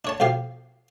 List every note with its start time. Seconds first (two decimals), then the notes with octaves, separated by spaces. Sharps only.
0.05 D4 C#5 A5
0.20 B1 F3 G4 F5